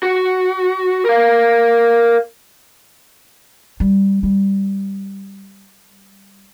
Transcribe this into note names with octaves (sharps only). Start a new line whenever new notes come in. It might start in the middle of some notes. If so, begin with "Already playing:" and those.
F#4
A#4 F5
G3
G3